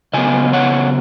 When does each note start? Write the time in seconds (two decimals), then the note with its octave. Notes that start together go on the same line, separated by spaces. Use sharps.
0.13 C#3 F#3 B3 D#5 G#5
0.53 C#5 F#5